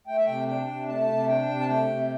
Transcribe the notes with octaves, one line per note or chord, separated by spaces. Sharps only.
A3 G5
E5
C3 G5
D4 G5
C3
A3 A5
C3
D4 G5
C3
A5
A3 G5
C3